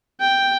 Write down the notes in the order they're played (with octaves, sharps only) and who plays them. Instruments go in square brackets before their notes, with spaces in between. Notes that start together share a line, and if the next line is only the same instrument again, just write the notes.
[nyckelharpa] G5